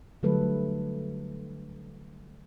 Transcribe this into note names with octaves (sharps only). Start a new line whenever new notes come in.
D3 F#3 G3 A3 A4 B4